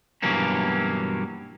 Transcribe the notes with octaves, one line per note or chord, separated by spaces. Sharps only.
G2 B2 E3 F#3 A#3 C#4